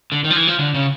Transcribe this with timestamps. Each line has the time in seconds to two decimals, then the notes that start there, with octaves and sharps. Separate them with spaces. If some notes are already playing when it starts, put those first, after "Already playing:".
0.12 D3
0.24 D#3
0.30 F3
0.36 E3
0.47 F3
0.59 D3
0.74 C#3